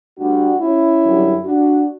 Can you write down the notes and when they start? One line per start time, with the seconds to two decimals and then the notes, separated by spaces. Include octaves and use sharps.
0.18 D2 D3 G3 D4 F#4
0.61 C#4 E4
1.03 F#2 D3 G3
1.45 D4 F#4